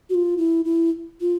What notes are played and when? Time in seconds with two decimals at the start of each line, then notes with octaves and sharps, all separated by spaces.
0.10 F#4
0.14 F4
0.38 E4
0.65 E4
1.21 F4